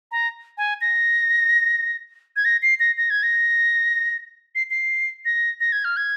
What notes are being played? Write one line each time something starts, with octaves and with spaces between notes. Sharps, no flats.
A#5
G#5
A#6
G#6
A#6
C7
A#6
A#6
G#6
A#6
C7
C7
A#6
A#6
G#6
F6
G#6